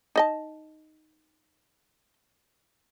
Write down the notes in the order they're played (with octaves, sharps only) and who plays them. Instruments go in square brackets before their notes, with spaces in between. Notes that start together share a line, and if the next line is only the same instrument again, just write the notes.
[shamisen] D#4 D#5 A5